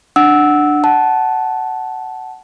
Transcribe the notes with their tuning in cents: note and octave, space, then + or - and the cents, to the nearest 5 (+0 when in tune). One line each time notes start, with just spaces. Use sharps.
D4 +15 F#5 +0 E6 -15
F#5 +15 A5 -10